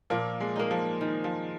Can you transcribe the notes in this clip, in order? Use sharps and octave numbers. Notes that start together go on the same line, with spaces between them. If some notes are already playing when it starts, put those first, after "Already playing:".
A#2 F3 A#3
G#3
A#3 D#4
F3
D#3
F3